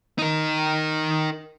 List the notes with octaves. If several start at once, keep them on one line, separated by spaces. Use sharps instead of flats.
D#4 A#4